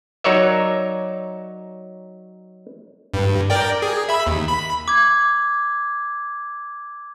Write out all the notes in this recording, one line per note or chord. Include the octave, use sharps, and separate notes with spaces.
F#3 D#4 A#4 C#5 D5 E5
G2
A#4 D5 G5
G#4
E5 B5
D#2
B5
D6 G#6